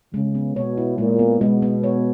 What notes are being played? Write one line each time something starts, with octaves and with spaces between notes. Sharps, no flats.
C#3 G#3
B3
B2 C#5
E4
A#2 G#3
B3
B2 G#3
B3
C#5